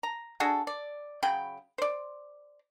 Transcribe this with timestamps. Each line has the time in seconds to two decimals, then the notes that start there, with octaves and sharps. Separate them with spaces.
0.03 A#5
0.40 D4 F#4 G#4 A4
0.67 D5
1.23 C#3 F#3 G5 B5
1.78 C5 D5